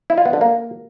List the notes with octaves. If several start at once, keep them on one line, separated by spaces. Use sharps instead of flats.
E4
F4
B3
D3
A#3